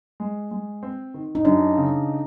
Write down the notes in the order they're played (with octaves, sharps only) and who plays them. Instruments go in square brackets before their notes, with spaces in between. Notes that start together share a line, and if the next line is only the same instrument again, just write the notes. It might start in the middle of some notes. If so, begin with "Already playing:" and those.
[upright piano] G#3
G#3
C4
D#3
[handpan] D#4
[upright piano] F#2 [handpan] D4
[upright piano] C#3